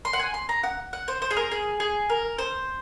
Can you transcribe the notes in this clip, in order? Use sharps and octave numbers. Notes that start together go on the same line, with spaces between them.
C6
F#5
G#5
C6
A#5
F#5
F#5
C5
C5
G#4
A#4
G#4
G#4
A#4
C5